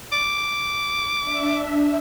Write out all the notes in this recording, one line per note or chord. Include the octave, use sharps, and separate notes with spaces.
D6
D4 E5